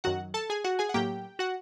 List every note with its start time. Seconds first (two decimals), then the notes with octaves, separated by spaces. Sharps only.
0.04 F#2 D#3 F#3 F#4 F#5
0.34 A4 A5
0.50 G#4 G#5
0.64 F#4 F#5
0.79 G#4 G#5
0.89 F#5
0.94 A2 F#3 A#3 G4 G5
1.39 F#4 F#5